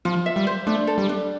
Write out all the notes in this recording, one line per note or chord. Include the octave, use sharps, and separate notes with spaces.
F3 F4
E5
G3
C5
A3 D4
A4
G3
D4